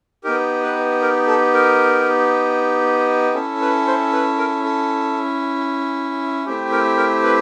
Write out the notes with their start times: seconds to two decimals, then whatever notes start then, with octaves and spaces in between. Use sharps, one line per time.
0.24 B3 D#4 G4 A#4
0.62 B4
1.02 A#4
1.27 A4
1.54 A#4
3.34 C#4 E4 A4
3.61 B4
3.87 C5
4.13 B4
4.38 A#4
4.64 A4
6.46 A3 C4 E4 G4
6.72 A#4
6.97 A#4
7.23 B4